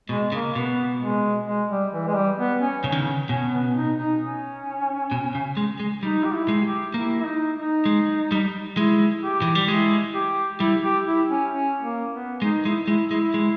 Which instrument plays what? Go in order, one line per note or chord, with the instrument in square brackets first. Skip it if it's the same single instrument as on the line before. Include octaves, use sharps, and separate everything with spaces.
[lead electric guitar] B2 [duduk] G#3
[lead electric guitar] C#3 [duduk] A#3
[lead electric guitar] B2 [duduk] B3
[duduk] G#3
G#3
G3
E3
G#3
G3
B3
C#4
[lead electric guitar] C#3 [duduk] C#4
[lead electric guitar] D#3
C#3
[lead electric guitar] B2 [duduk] C#4
[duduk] B3
D#4
D#4
C#4
[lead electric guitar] B2
C#3
G#3
G#3
[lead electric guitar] G3 [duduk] D#4
[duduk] G4
E4
[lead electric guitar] G#3
[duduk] G4
[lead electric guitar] A#3 [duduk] E4
[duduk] E4
D#4
D#4
[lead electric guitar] G#3
G3
[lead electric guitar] G#3 [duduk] E4
[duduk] G4
[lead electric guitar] E3
G3
[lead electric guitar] G#3 [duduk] E4
[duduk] G4
[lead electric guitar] G3 [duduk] E4
[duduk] G4
E4
C#4
C#4
A#3
B3
[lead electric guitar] G#3 [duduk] D#4
[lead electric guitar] G#3 [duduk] E4
[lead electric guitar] G#3 [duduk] E4
[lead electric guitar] G#3 [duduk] E4
[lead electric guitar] G#3